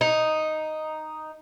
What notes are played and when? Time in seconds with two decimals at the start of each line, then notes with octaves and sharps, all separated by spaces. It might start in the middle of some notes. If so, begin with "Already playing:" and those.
0.01 D#4